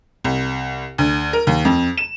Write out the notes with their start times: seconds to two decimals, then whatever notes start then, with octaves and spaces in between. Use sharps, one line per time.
0.24 C2
0.98 D2
1.33 A#4
1.47 D#2
1.65 F2
1.98 E7